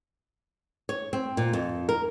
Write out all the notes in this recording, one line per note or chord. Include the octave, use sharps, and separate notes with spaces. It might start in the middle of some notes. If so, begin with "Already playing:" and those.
C#5
C4
A#2
F2
A#4